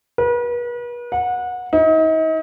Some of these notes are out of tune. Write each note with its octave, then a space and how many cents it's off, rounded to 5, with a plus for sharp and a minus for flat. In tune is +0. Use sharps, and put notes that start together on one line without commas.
B4 -40
F#5 -25
D#4 +40